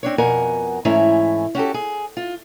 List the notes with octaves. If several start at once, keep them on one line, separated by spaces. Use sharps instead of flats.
C4 D4 C#5
F2 B2 A#4 F#5 G#5
G#2 E3 A3 C#4 E4 A#5
C#4 F#4 G4 A4
G#4
F4